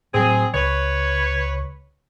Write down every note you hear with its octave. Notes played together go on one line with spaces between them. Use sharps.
A2 F#3 C4 G#4
C#2 B4 C#5